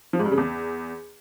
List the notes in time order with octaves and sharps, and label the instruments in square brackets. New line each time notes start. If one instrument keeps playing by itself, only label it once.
[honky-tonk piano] F3
G#2
G2
C#3
E2